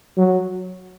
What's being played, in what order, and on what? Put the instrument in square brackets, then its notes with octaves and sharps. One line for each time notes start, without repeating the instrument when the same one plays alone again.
[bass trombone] F#3